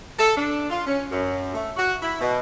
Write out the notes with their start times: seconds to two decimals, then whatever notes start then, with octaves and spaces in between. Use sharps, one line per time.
0.18 A4
0.36 D4
0.70 F4
0.86 C#4
1.11 F#2
1.55 A3
1.77 F#4
2.02 E4
2.21 B2